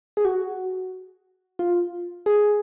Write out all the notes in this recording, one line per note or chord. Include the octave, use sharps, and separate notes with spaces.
G#4
F#4
F4
G#4